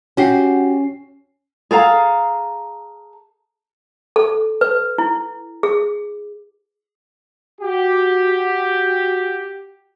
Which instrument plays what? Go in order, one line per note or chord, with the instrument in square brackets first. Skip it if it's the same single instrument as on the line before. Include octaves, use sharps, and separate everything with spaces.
[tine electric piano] C#4 C7 [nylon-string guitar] F#4 G4
[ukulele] G#4 A4 F5 A#5
[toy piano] A4
B4
E4
G#4
[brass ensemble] F#4 G4